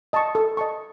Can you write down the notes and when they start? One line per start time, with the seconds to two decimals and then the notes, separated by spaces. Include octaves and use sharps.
0.13 D#5 A5 C#6
0.35 A4
0.57 D#5 A5 C#6